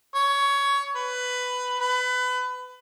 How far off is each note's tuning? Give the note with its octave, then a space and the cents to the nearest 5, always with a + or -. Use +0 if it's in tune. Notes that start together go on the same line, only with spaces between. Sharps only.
C#5 +15
B4 +10
B4 +25